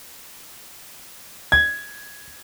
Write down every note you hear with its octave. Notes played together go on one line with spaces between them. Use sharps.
G#6